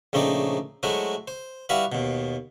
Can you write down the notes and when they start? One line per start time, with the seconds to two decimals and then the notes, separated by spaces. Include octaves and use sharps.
0.13 A#1 C#3 A3 C4 D#4 D5
0.83 F#3 G#3 A3 E4 F#4 C5
1.28 C5
1.69 G3 E4 F#4 B4 E5 F5
1.92 D#2 B2